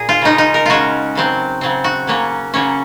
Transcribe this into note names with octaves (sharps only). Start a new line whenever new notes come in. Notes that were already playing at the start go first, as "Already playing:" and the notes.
Already playing: A#2 G#4
F4
C#3 G#3 C#4 D#4
D#4
A#4
C#3 G#3 C#4 F4 F#4
C#3 F#3 C4
C#3 F#3 C4
F#4
C#3 F#3 A#3 C#4
C#3 F#3 A#3 C#4